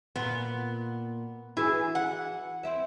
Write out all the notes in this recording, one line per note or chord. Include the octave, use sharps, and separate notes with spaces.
A#2 B3 F4
E3 E4 F#4 G#4
F#5
C4 E4 E5